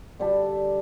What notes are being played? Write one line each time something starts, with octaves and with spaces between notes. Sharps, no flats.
D3 G3 A4